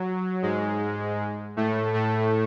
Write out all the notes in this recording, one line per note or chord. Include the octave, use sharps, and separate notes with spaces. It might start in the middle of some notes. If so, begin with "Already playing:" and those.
Already playing: F#3
G#2 G#3
A2 A3
A2 A3